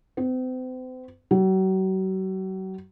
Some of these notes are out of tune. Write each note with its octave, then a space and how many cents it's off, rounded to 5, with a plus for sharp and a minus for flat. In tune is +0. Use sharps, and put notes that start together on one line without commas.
C4 -40
F#3 +40